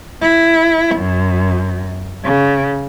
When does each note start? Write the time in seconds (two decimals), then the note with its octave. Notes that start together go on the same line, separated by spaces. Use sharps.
0.21 E4
0.95 F#2
2.24 C#3